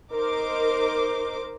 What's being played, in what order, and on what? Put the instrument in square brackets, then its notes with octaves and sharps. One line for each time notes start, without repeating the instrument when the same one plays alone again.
[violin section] D#4 A#4 C5 D6